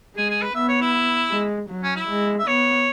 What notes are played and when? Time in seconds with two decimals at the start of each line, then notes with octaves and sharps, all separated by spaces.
0.16 G#3 G#4
0.30 G#4
0.42 B4
0.54 B3 E5
0.68 C#5
0.81 E4
1.31 G#3
1.70 F#3
1.83 C#4
1.96 E4
2.08 G#3
2.39 E5
2.47 B3 C#5